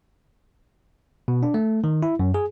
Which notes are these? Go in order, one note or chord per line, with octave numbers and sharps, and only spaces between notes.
B2
D4
A3
D#3
E4
F#2
G#4